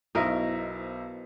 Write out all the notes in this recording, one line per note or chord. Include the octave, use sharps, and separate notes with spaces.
B1 B2 E4 A#4 C5 D#5 E5